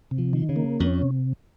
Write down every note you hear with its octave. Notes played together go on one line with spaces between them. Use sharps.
C3
F3
D#3
C#3
A#3
F2 C#4
C3